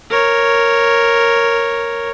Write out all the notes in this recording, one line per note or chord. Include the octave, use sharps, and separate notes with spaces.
A#4 C#5